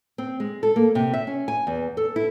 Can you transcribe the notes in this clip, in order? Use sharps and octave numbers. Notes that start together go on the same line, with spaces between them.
C4
G#3
A4
A#3
C3
E5
C#4
G#5
E2
A4
E4